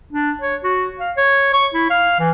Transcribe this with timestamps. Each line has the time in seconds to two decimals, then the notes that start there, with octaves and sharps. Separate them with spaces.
0.13 D4
0.41 C#5
0.64 F#4
0.99 F5
1.17 C#5
1.53 C#6
1.74 E4
1.90 F5
2.20 E3